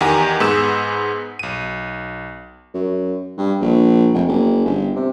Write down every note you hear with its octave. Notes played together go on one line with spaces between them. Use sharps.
E2 D#3 G4 F#5 G#5 A#5
G#2 B3 G#4 E6 E7
B1 D#7
F#2
G2
A#1
F1
F#1
G1
C3